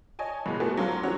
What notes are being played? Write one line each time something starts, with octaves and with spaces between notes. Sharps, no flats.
C#5 D#5 G#5 A5
A1 B2 G#3
A3 B3 F#4 G#5 A5
G#2 F#3 C#4 F4
E3 G#3 C#4 D4 F#4 C#5